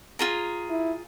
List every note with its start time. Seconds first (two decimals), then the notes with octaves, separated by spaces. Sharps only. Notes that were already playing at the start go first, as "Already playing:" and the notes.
0.19 F4 G#4 A#5
0.70 E4